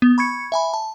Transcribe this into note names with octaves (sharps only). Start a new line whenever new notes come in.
B3
B5 C#6 G#6 C#7
E5 G#5 B5
A5